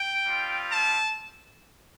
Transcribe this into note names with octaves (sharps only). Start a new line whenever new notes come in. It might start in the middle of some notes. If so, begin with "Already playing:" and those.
Already playing: G5
G3 C4 F4
A5